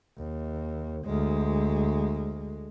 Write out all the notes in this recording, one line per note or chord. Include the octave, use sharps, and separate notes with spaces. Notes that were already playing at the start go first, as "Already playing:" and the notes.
D#2
D2 G#3